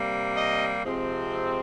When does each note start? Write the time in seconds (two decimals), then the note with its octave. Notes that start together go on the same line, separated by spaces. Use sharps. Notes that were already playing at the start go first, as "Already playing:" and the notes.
Already playing: C3 G3 A#3
0.35 D#5
0.84 C3 F3 G#3 C4